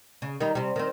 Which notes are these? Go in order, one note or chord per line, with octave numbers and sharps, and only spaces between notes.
C#3
D#3 G3 D#4
C3 G3
D#3 C4